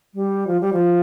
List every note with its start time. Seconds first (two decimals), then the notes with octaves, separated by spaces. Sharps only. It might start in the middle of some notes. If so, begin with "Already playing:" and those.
0.14 G3
0.47 F3
0.61 G3
0.73 F3